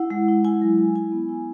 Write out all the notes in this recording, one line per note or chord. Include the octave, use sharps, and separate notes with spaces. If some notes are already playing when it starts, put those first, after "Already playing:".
Already playing: E4 F#5
G#3
E4
E4 G#5
F#3
E4
E4 G#5
B3
E4